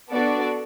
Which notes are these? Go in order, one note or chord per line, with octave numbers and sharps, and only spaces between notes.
B3 D4 F#4 A4 D5